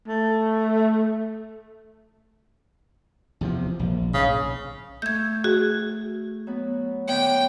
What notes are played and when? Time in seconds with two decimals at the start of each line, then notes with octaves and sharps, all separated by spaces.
0.08 A3
3.41 E2 C3 F3
3.79 A#1
4.14 B1 G#2 C#3
5.02 A3 A4 G6 G#6
5.44 F#4 G#4
6.47 F#3 B3
7.08 D3 B3 C#5 G5